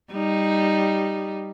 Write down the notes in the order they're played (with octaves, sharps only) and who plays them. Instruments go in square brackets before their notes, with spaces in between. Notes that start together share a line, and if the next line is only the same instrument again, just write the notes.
[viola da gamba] G3 D#4